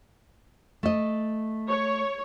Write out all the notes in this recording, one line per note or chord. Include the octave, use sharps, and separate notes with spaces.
A3 D#5
C#5